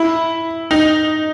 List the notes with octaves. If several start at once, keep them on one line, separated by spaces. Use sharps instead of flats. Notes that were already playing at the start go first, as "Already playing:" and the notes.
Already playing: E4
D#4